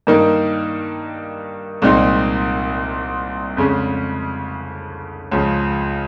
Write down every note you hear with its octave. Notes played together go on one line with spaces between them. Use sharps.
G2 D#3 A#3 D#4
C2 A#2 G#3 C4 D#4
F2 C#3 G#3 C#4
C#2 C#3 F3